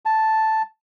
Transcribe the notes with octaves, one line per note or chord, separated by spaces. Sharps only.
A5